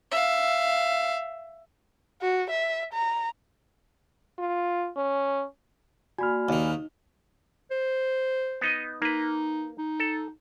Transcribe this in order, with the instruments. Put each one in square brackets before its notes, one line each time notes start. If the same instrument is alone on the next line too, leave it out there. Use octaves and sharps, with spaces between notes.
[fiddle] E5 F5
[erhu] F#4
E5
A#5
[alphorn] F4
C#4
[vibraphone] A#3 D5 [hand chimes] F#4 [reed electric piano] G#5 B5 F6
[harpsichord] D#2 D#3 [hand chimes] D#4
[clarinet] C5
[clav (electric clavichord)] B3 D#4 D#5
[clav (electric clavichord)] A#3 B4 [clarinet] D#4
[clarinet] D#4
[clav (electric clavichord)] A4